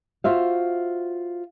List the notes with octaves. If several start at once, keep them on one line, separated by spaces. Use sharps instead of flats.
F4 F#4 C5 E5 F5